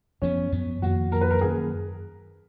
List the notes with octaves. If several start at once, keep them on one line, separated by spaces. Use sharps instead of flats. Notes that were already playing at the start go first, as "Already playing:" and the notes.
F#2 F3 B3 C#4
F#2 F3 B3
F2 D#3 A#3 F#4
F2 D#3 A#3 A#4
B4
A#4
F#2 D#3 A#3 C#4 G#4